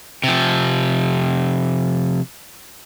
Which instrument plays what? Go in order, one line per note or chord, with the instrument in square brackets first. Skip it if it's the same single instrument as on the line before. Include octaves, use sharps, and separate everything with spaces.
[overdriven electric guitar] C3 F3